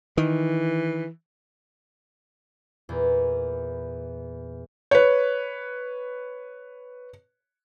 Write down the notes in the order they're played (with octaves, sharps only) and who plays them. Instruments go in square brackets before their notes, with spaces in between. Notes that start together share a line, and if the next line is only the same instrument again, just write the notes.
[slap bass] D#3 [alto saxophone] E3
[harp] E2 A#2
[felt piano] B4 C#5